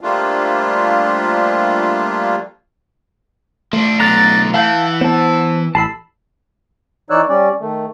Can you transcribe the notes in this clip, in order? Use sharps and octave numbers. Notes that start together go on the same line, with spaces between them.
F3 G3 A3 A#3 D4 F4
F3 A3 D4
B1 D3 A#5 F#6 A6
E3 F5 F#5 A5 G6
B3 C5 A5
A1 A5 B5 E6 C7
E3 D#4 C#5 D5 E6 F#6
G3 C#4 D5
D#3 A3